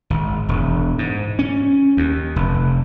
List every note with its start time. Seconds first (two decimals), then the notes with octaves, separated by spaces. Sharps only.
0.10 G#1
0.49 E1
0.99 G#2
1.39 C#4
1.97 D#2
2.36 F1